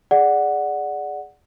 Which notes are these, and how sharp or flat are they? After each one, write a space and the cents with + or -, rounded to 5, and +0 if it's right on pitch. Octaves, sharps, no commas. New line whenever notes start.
G#4 +0 D5 +0 F#5 +0